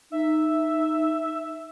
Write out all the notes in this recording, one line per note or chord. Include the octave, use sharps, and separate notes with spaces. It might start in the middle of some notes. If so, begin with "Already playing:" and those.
D#4 E5